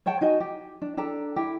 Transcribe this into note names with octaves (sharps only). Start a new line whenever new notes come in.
C#5 F#5 G5 A5
D#4 F#4 D#5 G#5
G4
D4
D4 G4 A4 A#5
E4 G4